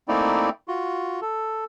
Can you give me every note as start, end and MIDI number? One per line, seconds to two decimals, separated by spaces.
0.08 0.50 57
0.08 0.50 58
0.08 0.50 60
0.08 0.50 63
0.08 0.50 64
0.08 0.50 74
0.68 1.20 65
0.68 1.20 66
1.22 1.65 69